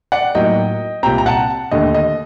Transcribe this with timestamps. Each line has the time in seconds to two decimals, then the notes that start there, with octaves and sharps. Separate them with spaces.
0.12 D5 F#5
0.35 A2 F#3 A#3 D#4 D#5 G5
1.03 C2 A#2 G3 C4 G5 A#5
1.18 A#5
1.26 F#5 A5
1.71 D#2 D3 A3 D#5
1.94 D#5